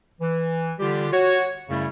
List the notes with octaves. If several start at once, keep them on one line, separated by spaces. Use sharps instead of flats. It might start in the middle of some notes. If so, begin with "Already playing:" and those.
E3
D3 G3 F4 G4
F#4 C#5
F#2 C#3 G3 A3 E4